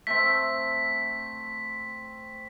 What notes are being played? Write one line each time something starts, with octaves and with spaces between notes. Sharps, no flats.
A3 C4 B6